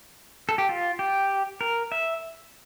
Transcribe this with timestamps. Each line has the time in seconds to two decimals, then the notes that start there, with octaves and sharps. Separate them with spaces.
0.49 A4
0.58 G4
0.69 F4
0.99 G4
1.61 A#4
1.92 E5